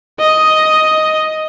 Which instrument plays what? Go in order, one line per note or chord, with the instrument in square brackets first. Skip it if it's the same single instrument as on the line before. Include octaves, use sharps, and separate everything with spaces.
[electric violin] D#5